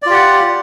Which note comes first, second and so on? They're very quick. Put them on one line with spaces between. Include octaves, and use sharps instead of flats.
D5 F4 G4 F#5